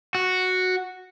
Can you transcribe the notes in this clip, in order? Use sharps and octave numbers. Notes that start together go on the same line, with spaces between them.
F#4